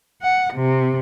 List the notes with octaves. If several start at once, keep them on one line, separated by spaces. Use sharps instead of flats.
F#5
C3